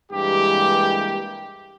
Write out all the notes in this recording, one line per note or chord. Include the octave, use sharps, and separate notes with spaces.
G2 E3 G#3 A#3 G4